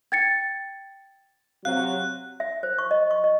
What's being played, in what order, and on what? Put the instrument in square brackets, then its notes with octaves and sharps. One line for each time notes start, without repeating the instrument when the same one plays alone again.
[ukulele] G5 [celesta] G#6 A6 C#7
[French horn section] C3 F#3 [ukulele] F#4 F5 [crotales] F#6
[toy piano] E5
C5
C#6
D#5
C#6
D#5